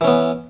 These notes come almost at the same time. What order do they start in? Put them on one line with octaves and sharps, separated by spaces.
E3 C#4 B3